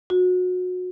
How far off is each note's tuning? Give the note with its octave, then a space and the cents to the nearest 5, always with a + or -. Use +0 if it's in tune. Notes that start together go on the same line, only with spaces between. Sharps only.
F#4 -25